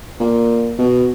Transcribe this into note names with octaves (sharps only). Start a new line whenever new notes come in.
A#2
B2